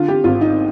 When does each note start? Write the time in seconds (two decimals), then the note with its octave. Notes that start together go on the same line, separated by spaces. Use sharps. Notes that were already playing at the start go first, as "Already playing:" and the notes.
Already playing: D3 F4
0.08 G4
0.24 G#1 F4
0.41 D#4